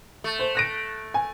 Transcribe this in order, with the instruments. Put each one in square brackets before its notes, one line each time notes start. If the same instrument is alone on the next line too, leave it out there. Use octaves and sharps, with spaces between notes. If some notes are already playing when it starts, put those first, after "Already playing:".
[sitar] A3
[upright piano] C5
F#6 A#6 D7
G#5